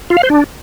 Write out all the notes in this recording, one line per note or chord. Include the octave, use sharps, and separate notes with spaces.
F4
F5
C5
D4